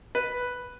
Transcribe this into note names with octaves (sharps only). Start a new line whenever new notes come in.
B4